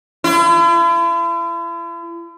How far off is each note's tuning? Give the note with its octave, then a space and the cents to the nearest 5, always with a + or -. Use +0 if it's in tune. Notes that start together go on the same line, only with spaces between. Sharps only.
E4 +45